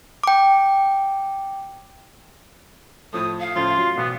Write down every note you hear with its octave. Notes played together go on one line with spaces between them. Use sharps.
G5 D6
A2 F3 A3 D#6
F5
A2 C#3 F3 F4
F#3
A1 B2 B3